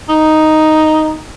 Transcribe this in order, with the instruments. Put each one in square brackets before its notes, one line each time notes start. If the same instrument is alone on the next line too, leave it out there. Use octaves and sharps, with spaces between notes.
[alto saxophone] D#4